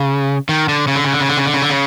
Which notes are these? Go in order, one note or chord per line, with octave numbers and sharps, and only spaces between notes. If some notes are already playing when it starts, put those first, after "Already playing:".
Already playing: C#3
D#3
D3
C#3
D3
C#3
D3
C#3
D3
C#3
D3
C#3
D3
C#3